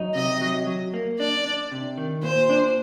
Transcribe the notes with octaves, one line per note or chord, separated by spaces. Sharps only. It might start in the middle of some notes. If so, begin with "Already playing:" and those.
Already playing: F#3 D#4
C3 D#5
F#3
F#3
A#3
D4 D5
D4
C3
D#3
A#2 C5
D4